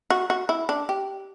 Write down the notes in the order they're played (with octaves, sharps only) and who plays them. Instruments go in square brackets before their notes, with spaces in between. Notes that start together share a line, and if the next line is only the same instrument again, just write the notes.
[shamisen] F#4
F#4
E4
D4
G4